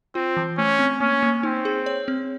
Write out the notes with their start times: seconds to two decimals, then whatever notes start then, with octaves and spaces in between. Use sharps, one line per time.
0.15 C4 F4
0.37 E3
0.58 A3 C#4
0.79 C4
1.00 A#3 C#4
1.23 A#3
1.43 C4 D#4
1.65 G#4
1.86 C#5
2.08 C4